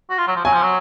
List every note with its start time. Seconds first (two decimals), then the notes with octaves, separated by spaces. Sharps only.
0.10 F#4
0.18 F4
0.27 F#3
0.36 F3
0.44 F#3 G#5
0.53 F3
0.62 F#3